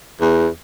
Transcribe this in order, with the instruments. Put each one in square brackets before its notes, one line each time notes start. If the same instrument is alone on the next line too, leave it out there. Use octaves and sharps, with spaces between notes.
[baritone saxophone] E2